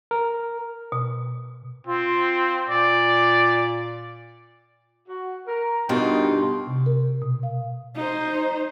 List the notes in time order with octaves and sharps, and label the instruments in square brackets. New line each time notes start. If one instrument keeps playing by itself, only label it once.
[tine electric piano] A#4
[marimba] B2
[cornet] C4 [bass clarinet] F4
[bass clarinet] A#2 [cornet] D5
[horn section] F#4
A#4
[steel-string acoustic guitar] G2 B2 F4 [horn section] D#4 G5
[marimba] C3
A#4
B2
F5
[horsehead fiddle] D#4 C5